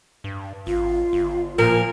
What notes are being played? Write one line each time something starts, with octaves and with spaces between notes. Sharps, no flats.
G2
G#1 F4
G1
A#2 F3 A#4